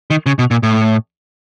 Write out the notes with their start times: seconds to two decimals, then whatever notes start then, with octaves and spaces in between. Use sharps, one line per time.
0.10 D#3
0.26 C#3
0.39 B2
0.51 A#2
0.63 A2